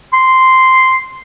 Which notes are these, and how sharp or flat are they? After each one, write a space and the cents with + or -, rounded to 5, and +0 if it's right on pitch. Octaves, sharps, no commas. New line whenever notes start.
C6 -5